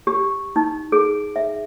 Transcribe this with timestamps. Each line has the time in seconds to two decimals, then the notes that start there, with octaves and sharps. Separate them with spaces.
0.07 G4
0.56 D#4
0.92 G#4
1.36 E5